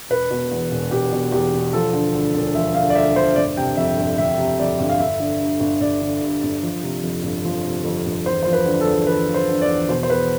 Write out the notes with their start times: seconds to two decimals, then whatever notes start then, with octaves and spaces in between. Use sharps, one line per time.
0.10 E1 B4
0.31 B2
0.51 E2
0.71 E1
0.91 E1 G4
1.12 B2
1.32 E2 G4
1.52 E1
1.73 F3 A4
1.93 D3
2.14 D2
2.35 E1
2.55 F3 E5
2.75 D3 F5
2.90 D5
2.95 D2 E5
3.16 E1 C5
3.36 G1 D5
3.57 C3 G5
3.77 F2 E5
3.98 G1
4.18 G1 E5
4.38 C3
4.59 F2 D5
4.80 G1
4.90 F5
4.99 G1 E5
5.20 D3
5.40 G2
5.60 G1
5.80 G1 D5
6.02 D3
6.22 G2
6.43 G1
6.63 F3
6.83 C3
7.03 F2
7.23 G1
7.45 F3
7.65 C3
7.84 F2
8.06 G1
8.26 E2 C5
8.43 F3 C5
8.53 B4
8.66 D3
8.81 A4
8.87 E2
9.07 E2 B4
9.28 F3
9.34 C5
9.48 D3
9.61 D5
9.69 E2
9.89 B2 C5
10.03 C5
10.10 E2 B4